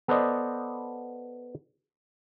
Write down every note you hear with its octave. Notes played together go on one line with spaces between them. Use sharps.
B3 A4 B4 C5 D5 D#5